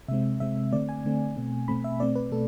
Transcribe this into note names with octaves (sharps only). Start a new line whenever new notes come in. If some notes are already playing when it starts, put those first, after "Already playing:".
C3 G#3 C4 E5
C3 G#3 C4 E5
D3 A3 C4 D5
G#5
D3 A3 C4
B2 A3 C4
B2 A3 C4 B5
E5
B2 A3 C4 D5
B4
B2 A3 A4